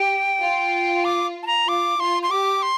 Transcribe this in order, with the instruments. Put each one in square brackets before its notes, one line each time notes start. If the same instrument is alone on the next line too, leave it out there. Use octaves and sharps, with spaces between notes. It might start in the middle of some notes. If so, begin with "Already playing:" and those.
Already playing: [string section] G4 [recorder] G5
[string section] F4
[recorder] D6
A5
A#5
[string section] F4 [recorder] D6
[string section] F4 [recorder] C6
[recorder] C6
[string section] G4 [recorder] D6
[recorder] C6